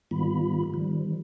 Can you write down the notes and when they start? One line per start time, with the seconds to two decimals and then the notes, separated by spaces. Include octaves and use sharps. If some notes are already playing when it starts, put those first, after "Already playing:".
0.11 G#2 D#3 G3 B3 F4 B5
0.74 D#3 F3 G3